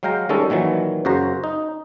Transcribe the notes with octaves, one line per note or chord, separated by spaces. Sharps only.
F#3 G#3 F5 G5 A#5
D#3 G3 G#3 C#4 A4
A#2 D#3 E3 F#3
F#2 C#3 F#4 C5 A#5
D#4